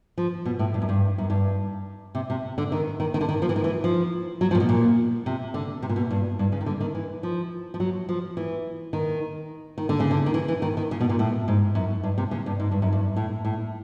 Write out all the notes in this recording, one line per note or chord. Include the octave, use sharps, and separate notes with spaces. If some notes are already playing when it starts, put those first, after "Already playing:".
F3
B2
A2
G2
F#2
G2
F#2
G2
C3
C3
D3
D#3
D#3
D#3
D3
D#3
F3
E3
D#3
E3
F3
F#3
F3
A#2
B2
A#2
C3
D3
C3
A#2
B2
G2
G2
C#3
D#3
D3
D#3
E3
F3
F3
F#3
F3
E3
D#3
D#3
D3
C#3
D3
D#3
E3
E3
D#3
D#3
C#3
B2
A#2
A2
G#2
F#2
G2
C3
C#3
G2
G#2
G2
F#2
G2
A2
A2